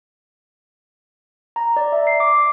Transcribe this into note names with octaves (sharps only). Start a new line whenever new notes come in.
A#5
D5
E5
C7
D6